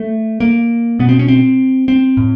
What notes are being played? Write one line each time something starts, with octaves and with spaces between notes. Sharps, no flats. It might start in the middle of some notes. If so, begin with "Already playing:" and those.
Already playing: A3
A#3
B2 B3
C4
C#4
C4
C4
A2